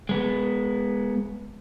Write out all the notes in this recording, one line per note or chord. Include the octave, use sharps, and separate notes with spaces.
G#3 B3